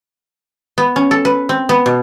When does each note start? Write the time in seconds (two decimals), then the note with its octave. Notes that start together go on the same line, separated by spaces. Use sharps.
0.78 B3
0.96 C#4
1.11 A4
1.25 B4
1.49 C4
1.69 B3
1.86 B2